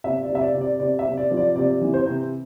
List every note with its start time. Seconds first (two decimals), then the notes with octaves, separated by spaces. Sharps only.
0.04 C3 E5
0.23 D5
0.30 C3
0.35 E5
0.42 D5
0.54 C3
0.61 D5
0.80 C3 D5
0.99 E5
1.05 C3
1.17 D5
1.31 F3
1.37 D5
1.56 C3 D5
1.81 E3
1.94 C5
2.06 C3